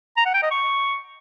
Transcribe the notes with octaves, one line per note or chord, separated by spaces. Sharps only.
A#5
F#5
G5
D#5
C#6